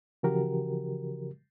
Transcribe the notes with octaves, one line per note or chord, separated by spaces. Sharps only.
C#3 E3 F3 F#4 G4 A#4